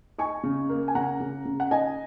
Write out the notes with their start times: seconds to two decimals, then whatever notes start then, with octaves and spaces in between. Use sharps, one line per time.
0.18 D#4 G#5 C#6
0.43 C#3
0.69 A#3
0.88 G#5
0.95 C#3 F#5 A#5
1.20 C#3
1.45 C#3
1.60 F#5
1.71 D#4 D#5 G#5